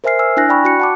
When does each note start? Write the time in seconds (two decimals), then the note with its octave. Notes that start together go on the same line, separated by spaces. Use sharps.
0.04 A#4 C5 E5 G#5 F6 C7
0.19 G#5 E6 F6
0.37 D4 E4 G#5 F#6 A#6
0.49 D5 G5 B5 C#6
0.64 F#4 F#6 C#7
0.80 F#5 A5 D6